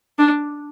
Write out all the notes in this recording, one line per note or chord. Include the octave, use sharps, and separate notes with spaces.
D4